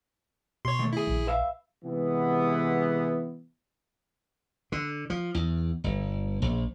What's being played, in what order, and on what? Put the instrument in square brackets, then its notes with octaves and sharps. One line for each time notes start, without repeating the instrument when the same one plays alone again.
[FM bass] B2 [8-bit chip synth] C#5 C6
[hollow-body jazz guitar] D#3 A3
[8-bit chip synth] E4 G#4
[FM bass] A#1
[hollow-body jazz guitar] B4 E5 F5
[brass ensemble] C3 E3 G#3 B3
[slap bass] D3
F3
E2
G1
A#1